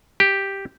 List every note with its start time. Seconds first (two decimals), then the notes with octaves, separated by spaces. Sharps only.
0.20 G4